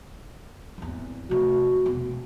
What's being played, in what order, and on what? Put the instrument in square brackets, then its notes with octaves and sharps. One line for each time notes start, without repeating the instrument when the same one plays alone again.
[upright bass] G#1 E2
[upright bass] C3 A3 [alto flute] F#4
[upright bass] E1